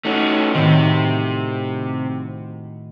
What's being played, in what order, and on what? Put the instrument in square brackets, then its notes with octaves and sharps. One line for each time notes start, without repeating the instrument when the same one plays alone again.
[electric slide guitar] A3 C#4 [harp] D#4 F#4
[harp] A2 D#3 [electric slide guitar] C3